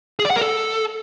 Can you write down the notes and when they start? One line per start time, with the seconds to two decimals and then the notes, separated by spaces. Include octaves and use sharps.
0.19 G#4
0.25 D5
0.30 F#5
0.36 A#4
0.41 A4